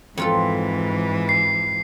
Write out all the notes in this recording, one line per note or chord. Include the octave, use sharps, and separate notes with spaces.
F2 G#2 E3 F4 A4
C7